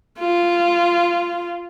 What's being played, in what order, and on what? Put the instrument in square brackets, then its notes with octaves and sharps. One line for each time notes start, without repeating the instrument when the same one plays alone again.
[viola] F4